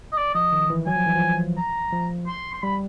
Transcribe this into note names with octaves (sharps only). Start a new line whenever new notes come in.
D#5
D5
F3 D#5
D#3
E3
F#3 G#5
F3
E3
F3
A#5
F3
C6
C6
G3 B5